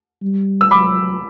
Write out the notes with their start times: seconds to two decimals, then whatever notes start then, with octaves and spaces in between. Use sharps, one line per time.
0.22 G3
0.61 E6
0.71 F#3 B5 D6